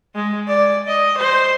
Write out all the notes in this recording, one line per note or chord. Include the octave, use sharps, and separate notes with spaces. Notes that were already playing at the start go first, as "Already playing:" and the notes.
G#3
D5
D#5
C5